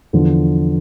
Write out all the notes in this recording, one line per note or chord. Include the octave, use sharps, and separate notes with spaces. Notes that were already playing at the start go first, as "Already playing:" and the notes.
E2 D3 F3